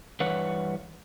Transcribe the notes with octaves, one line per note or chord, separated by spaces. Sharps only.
G2 E3 B4 C#5 F#5